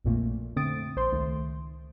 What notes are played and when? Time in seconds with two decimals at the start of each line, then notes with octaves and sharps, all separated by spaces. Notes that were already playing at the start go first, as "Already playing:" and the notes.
0.05 A#1 F2 A#2 A3 A#3
0.56 D3 A3 C4 D#6 A6 D7
0.96 A#1 C5 C6
1.12 C#2 D#3 A3